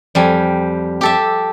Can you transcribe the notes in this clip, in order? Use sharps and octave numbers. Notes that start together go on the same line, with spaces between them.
F2 G3 G#5
G4 A4 E5